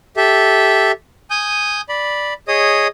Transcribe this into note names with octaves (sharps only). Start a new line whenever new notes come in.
G4 A4 E5
G#5 D#6 G6
D5 B5
G#4 C#5 D#5 D#6